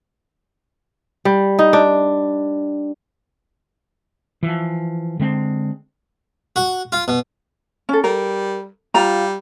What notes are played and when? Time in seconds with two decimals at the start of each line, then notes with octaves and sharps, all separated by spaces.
1.25 G3
1.59 D#4
1.73 D4
4.43 E3 F3
5.19 D3 G#3 C4
6.56 F#4
6.92 F4
7.08 B2
7.89 C#4 A4
8.04 G3 A#4
8.94 G3 F4 A#5